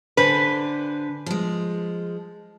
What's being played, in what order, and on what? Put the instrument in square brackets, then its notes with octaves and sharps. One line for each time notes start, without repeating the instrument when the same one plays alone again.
[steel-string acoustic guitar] D3 C5 G#5 [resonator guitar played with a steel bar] B4
[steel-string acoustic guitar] F3 G#3